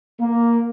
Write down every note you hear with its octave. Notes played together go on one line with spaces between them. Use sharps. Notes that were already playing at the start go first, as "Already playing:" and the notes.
A#3